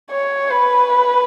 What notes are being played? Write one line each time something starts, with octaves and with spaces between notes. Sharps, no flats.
C#5
B4